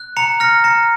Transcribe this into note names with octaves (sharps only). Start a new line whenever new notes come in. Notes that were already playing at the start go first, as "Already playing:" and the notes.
Already playing: F#6
A#5 C#7 F7
F6 A#6 C#7
A#5 A#6 C#7